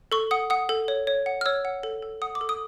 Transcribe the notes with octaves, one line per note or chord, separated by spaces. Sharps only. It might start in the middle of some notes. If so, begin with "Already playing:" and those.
A4 C#6
F#5 D#6
F#5 D#6
A4
C#5
C#5
F#5
F6
C#5 E6
F#5
A4
A4
F#5 D#6
D6
A4
D#6